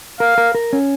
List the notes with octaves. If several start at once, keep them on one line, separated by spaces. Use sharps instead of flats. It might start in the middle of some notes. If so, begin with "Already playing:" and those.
A#4 F5
A#4
A#4
C#4